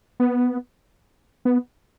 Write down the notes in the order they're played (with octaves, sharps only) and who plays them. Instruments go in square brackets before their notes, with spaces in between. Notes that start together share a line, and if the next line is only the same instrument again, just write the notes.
[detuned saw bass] B3
B3